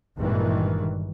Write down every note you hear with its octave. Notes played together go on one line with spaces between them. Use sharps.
G#1 G2 A#2 D#3 E3